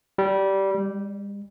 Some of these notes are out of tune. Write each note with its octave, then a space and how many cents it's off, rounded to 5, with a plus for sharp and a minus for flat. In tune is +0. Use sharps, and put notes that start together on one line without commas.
G3 -15
G3 +45